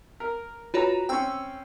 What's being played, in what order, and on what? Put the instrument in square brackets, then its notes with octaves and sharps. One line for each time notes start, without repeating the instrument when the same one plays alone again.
[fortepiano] A#4
[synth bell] F4 F#4 C#5 [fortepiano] B4 A#5
[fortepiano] C4 C#4 [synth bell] G5 E6